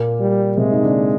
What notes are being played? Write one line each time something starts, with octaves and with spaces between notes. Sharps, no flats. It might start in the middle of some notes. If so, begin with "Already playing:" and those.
Already playing: A#2 A#3
G3
C3 G#3 C4
D#4
D3 D4